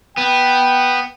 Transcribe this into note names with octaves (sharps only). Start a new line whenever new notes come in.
B3 G5